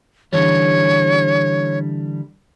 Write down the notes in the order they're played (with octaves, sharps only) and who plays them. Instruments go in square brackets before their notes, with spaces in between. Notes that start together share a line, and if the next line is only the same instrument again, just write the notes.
[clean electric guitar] D3 E3 G3 [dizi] C#5